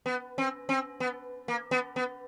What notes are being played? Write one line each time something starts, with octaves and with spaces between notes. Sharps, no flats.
B3
C4
C4
B3
A#3
B3
B3